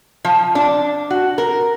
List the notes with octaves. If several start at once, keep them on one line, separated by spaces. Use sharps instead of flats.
F3
D4
F#4
A#4